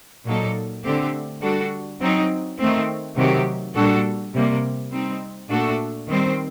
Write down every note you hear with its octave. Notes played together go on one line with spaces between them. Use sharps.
A#2 F#3 A#3 D#4 A4
D3 A3 C4 G4
G3 D4 F#4 A4
F#3 C4 D#4
D#3 A3 C4
C3 D#3 F#3 C4 G4
A#2 G3 D4 F#4 A4
C3 G3 A#3
G3 C4 D#4
A#2 A3 D4 F#4 A4
D#3 G3 C4